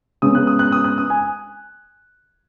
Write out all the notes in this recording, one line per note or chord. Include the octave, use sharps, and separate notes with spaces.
C#3 G#3 B3 D#6
F#6
D#6
F#6
D#6
F#6
D#6
G#5